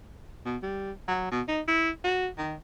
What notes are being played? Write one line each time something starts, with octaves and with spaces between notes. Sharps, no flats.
B2
G3
F#3
B2
D#4
E4
F#4
D#3